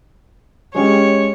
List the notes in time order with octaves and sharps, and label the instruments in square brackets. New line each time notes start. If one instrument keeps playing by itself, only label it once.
[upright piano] G#3 C#4 G4 [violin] C#5